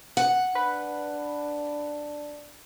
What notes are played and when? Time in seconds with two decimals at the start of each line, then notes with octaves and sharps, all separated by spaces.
0.17 F#5
0.55 D4 B4